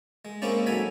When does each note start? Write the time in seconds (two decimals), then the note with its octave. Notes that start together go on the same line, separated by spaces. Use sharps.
0.25 G#3
0.42 G#3 A#3 C4 C#4 E4 D5
0.66 G#2 F#3 A4 G#5 B5